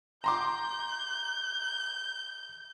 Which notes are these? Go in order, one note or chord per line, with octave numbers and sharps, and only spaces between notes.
A#5 C6 D6 G6